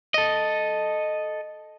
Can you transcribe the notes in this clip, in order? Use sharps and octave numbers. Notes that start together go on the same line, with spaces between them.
A4 D#5